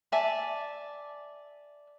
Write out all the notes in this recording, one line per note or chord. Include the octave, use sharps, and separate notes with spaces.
D5 E5 G#5 A5